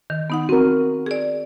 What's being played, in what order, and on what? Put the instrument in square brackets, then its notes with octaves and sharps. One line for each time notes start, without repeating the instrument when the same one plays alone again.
[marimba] D#3
B3 D#4 F#5
[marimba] C4 [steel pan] F#4 A#4
[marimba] G#4 D5